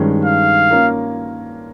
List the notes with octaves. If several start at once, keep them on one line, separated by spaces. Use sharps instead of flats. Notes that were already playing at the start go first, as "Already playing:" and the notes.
Already playing: G2 D#3 G#3 C#4
F5
A#3 C#4 F4 A#4